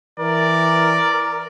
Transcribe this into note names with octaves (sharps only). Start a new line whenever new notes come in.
E3 A#4 D5